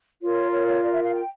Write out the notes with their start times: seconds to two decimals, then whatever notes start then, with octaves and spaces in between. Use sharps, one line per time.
0.21 F4 A#4 C#5
0.52 C#5
0.67 C#5
0.82 D5
0.93 E5
1.04 F5
1.14 G5